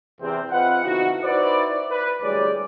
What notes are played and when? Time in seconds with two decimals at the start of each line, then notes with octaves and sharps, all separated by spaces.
0.21 E2 C3 C4
0.51 C4 F4 B4 D#5 F#5
0.85 F2 B2 D3 D#4 E4 F#4
1.23 D#4 E4 F#4 B4 C5 D5
1.91 B4
2.22 D2 E3 G3 G#3 C#5 D5